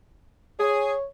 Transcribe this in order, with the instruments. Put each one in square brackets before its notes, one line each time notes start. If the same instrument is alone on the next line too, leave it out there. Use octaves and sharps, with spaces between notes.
[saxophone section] G#4 [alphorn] C#5